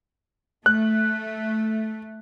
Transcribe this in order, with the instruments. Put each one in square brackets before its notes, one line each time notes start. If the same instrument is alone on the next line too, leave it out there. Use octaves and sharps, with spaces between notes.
[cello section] A3 [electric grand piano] F#6